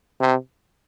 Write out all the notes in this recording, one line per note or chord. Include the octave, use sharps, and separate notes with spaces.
C3